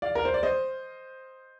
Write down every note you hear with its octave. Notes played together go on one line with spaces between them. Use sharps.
D5 F5
A#4
C5
D5
C5 D#5